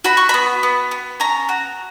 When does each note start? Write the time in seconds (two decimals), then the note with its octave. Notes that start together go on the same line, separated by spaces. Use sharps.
0.04 F#4 B5
0.17 C#6
0.29 B3 B5
0.63 B3
0.91 B3
1.20 C#4 A#5
1.49 F#4